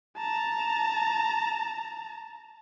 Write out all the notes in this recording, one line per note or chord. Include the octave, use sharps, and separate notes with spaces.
A5 A#5